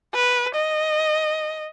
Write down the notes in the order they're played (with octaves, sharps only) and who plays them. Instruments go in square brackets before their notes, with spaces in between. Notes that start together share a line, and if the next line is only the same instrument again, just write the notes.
[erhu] B4
D#5